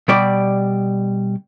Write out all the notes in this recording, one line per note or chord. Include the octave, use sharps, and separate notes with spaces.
B2 G3 D5